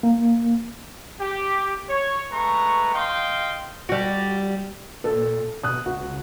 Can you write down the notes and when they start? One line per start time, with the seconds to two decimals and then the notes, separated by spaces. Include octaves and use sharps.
0.03 A#3
1.20 G4
1.89 C#5
2.32 G#3 A3 B4 A#5 C#6
2.94 D#5 F5 G5 C6
3.89 G3 F#4
5.04 A#2 A4
5.63 B2 D#6 F#6
5.86 C#2 F#4